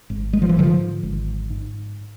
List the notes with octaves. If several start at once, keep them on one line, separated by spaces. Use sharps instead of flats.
G#1
G#3
F3
E3
G#2 D3 F3
G#1
G#2